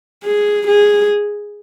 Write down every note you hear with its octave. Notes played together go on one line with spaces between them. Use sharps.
G#4
G#4